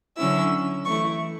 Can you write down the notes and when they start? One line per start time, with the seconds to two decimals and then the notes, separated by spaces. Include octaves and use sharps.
0.17 D3 F#3 C#4 E4 E6
0.85 E3 A3 E4 C#6